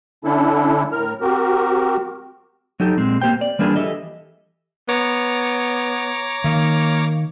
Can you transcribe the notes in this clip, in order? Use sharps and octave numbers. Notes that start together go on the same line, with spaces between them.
D3 C#4 D4 E4 A4
A2 A#4 F6
C4 F#4 G4 A#4
F#3 D#4 G4 A4
A#2 G#3 C4
A#3 G4 C5 G5
D5
E3 G3 A#3 D4 F4 G#4
E3 G4 A4 D#5 E5
B3 C#5 A#5 D6
D#3 A#3